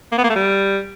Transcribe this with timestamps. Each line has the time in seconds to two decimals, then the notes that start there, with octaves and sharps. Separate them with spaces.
0.12 A#3
0.18 B3
0.24 A#3
0.30 A3
0.36 G3